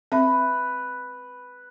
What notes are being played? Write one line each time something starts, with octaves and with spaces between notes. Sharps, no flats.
C4 B4 E5